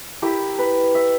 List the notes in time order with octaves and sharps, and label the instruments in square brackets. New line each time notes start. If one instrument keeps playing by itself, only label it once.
[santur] E4 G4 A#4
B4
E5